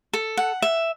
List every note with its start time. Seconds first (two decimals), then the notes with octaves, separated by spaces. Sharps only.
0.13 A4
0.37 F#5
0.62 E5